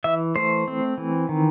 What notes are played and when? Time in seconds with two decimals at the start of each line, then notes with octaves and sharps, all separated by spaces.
0.04 E3 E5
0.36 A3 C5
0.68 C4
0.98 E3
1.29 D#3